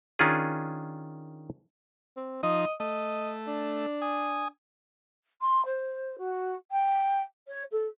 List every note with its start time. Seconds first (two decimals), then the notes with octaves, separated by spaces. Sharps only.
0.19 D#3 C#4 D4 F4 G#4
2.16 C4
2.43 F3 D#4 D#5
2.80 A3 D#5
3.47 D4
4.02 G#5 D#6
5.41 C6
5.65 C5
6.18 F#4
6.71 G5
7.47 C#5
7.71 A4